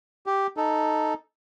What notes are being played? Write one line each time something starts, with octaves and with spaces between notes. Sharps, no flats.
G4
D#4 A4